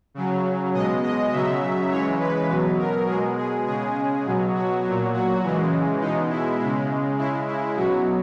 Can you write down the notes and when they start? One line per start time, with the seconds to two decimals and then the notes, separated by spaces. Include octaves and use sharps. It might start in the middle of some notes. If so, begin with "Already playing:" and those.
0.14 C#3 F#3
0.73 B2 G#3 D#5
1.03 D#5
1.32 C#3 F#3 E5
1.90 C#3 E3 G#3 C#5
2.20 B4
2.49 B2 F#3
2.78 A#4
3.07 B2 G#3 G#4
3.37 G#4
3.66 C#3 G#3 G#4
4.25 B2 F#3
4.54 F#4
4.83 A#2 F#3
5.13 F#4
5.42 C#3 E3 G#3
6.01 B2 G#3 D#4
6.29 E4
6.60 C#3 G#3
7.18 C#3 G#3 E4
7.47 E4
7.76 B2 F#3 F#4